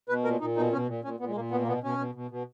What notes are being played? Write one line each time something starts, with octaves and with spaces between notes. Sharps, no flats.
B2 B4
A#2 A#4
A#2 D#4
B2 D#4
B2 C#4
A#2
A#2 C#4
A#2 B3
G#3
A#2 A#3
B2 B3
A#3
B2 B3
B2 C#4
B2
B2
B2